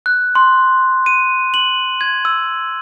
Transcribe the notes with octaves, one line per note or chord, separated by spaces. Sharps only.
F#6
C6
D#7
F#7
G#6
E6